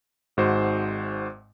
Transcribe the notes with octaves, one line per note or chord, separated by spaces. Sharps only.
G#1 G#2 F#4 C5